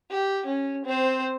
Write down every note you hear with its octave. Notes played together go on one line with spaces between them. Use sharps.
G4
C#4
C4 C5